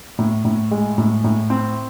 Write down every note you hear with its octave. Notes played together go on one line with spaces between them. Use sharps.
A2
A2
G#3
A2
A2
C4